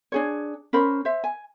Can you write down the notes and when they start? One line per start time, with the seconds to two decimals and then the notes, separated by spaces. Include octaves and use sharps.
0.12 D4 G#4 C#5
0.73 C#4 A#4 C5 B5
1.05 C5 E5
1.24 G#5